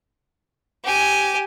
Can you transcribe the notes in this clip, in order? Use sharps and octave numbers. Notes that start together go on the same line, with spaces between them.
G4 G#5